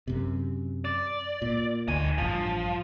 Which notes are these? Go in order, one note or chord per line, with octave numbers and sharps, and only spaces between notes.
F#2 C3
D5
A#2
D2 D#3 G#5
A1 G2 F3